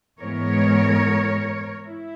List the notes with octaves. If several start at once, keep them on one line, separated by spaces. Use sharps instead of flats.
G#2 E3 G#3 B3 A#4 C#5
E4